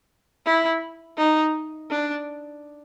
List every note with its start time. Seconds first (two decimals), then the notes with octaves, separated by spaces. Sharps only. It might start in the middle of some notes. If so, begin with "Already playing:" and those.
0.46 E4
1.18 D#4
1.91 D4